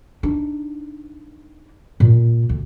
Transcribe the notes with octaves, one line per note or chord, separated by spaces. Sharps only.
D4 D#4
A#2
D2